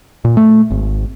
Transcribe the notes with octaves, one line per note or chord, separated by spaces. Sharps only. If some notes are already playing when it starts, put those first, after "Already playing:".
A#2
A3
G#1